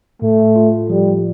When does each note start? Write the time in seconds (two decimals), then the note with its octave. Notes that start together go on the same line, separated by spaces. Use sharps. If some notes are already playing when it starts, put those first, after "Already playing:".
0.22 A2 A3
0.56 F4
0.89 F3 G3